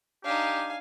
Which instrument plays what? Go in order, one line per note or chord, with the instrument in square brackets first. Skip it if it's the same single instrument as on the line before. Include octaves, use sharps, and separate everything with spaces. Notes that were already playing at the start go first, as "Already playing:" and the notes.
[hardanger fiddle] D4 D#4 [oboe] G4 [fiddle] F5 G#5